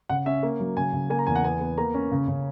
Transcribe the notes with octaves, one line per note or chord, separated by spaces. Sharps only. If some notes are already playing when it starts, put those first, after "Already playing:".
C#3 F#5
C#4 E5
A#3
F#3
C#3 G#5
C#3
A#3 G#5
A#5
E2 G#5
F#5
B3 G#5
B3
A#3 A#5
C#4
C#3
C#3